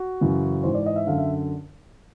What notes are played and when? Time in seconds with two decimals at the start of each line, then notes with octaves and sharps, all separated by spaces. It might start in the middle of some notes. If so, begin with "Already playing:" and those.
Already playing: F#4
0.21 F#2 C#3 E3
0.64 G#2 E3 C5
0.75 D5
0.86 D#5
0.96 E5
1.07 F#2 D3 F5
1.18 E5